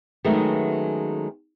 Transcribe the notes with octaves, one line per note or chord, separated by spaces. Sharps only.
D#3 F#3 G#3 A3 B3 C#4